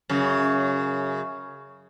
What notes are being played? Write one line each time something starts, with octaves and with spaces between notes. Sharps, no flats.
F#2 C#3